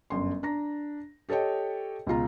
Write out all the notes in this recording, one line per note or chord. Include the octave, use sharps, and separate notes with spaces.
G1 F#2 C6
D4 A#5 A#6
G4 A4 C#5 D#5 G5
C#2 B2 F4 A#5